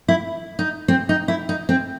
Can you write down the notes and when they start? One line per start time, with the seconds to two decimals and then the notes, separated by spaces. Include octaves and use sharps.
0.08 E4
0.59 D#4
0.88 C4
1.09 D#4
1.28 E4
1.49 D#4
1.69 C4